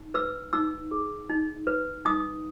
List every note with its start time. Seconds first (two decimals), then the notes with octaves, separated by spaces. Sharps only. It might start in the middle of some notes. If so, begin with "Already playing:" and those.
Already playing: D#4
0.14 B4 E6
0.53 D#4 E6
0.91 G#4
1.29 D#4
1.67 B4
2.05 D#4 D#6